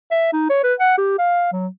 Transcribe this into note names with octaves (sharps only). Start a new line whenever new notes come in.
E5
D#4
C#5
B4
F#5
G4
F5
F#3